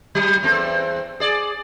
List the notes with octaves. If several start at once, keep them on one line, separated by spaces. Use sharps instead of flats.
F#3
E2 C4 A4
G#4 D5